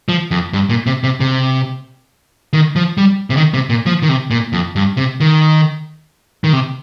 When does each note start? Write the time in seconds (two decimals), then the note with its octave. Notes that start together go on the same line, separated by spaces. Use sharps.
0.09 F3
0.31 F2
0.53 G2
0.69 A#2
0.86 C3
1.04 C3
1.20 C3
2.53 D#3
2.76 F3
2.98 G3
3.30 C3
3.37 D#3
3.54 C3
3.70 A#2
3.86 F3
4.02 D#3
4.09 C3
4.31 A#2
4.53 F2
4.76 G2
4.97 C3
5.20 D#3
6.44 D#3
6.53 C3